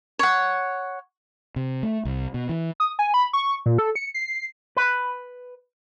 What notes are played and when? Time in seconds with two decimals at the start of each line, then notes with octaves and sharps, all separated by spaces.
0.19 C#5 F#5
1.56 C3
1.83 A3
2.05 C2
2.34 B2
2.49 E3
2.80 D#6
2.99 G#5
3.14 B5
3.33 C#6
3.66 A#2
3.78 A4
3.95 C#7
4.14 C7
4.77 B4